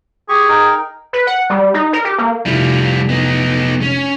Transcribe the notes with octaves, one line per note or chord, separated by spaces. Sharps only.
G4 G#4 C#6
D#4 A#4 G5
B4
F#5
G3
D#4
A#4
G4
A#3
F1 G3 E4 F4
B3 D#4
C#4